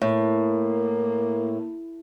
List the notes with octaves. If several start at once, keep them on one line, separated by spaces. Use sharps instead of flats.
A2 A#3